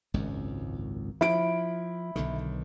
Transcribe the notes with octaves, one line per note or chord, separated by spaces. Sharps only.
G#1 C#2 F#2
F3 E4 D7
B1 D3 D#3